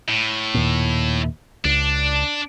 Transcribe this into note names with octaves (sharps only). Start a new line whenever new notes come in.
A2
D#2 A#2
C#2 D4